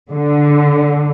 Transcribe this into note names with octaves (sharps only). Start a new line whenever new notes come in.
D3